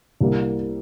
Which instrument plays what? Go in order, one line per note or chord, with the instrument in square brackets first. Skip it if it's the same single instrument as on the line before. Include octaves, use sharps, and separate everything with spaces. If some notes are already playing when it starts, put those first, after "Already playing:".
[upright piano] C2 C3 G3 A#3